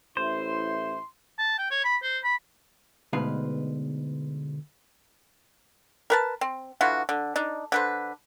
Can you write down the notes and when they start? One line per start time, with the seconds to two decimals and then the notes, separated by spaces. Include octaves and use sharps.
0.17 A1 E4 C5 C6
1.38 A5
1.58 G5
1.71 C#5
1.84 B5
2.03 C5
2.24 B5
3.13 D2 B2 G#3 D#4 B4 F5
6.10 A#4 B4 A5
6.41 C4
6.81 D3 E3 F4 F#4
7.09 D3
7.36 D4 D#4
7.72 D3 B4 C5